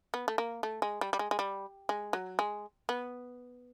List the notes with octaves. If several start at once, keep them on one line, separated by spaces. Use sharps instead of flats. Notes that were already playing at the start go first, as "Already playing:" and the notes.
B3
A3
A#3
A3
G#3
G3
G3
G#3
G#3
G3
G#3
F#3
G#3
B3